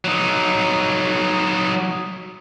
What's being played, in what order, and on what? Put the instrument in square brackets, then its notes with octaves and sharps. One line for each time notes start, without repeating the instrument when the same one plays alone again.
[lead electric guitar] F#3 D#4